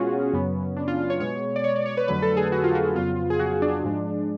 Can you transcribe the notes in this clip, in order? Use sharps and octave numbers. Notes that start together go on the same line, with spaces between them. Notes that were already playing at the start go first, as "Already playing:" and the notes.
Already playing: B2 G#3 B3 C#4 F4 F#4 G#4
F#2 C#3 F#3 B3
D4
F4
C#5
B2 G#3 B3 C#5
D5
C#5
D5
C#5
B4
F2 D3 F#3 A3 B4
A4
G#4
F#4
F4
F#4
F2 C#3 F#3 B3 F4
G#4
F#4
D4
G#2 F3 G#3